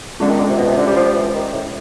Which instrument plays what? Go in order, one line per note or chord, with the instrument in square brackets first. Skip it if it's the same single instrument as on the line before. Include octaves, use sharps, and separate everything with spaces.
[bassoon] D3 [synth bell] G#3 C#4 F4
[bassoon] D#3
D3
C3
B2
C3
D3
G3
F3
E3
D#3
A2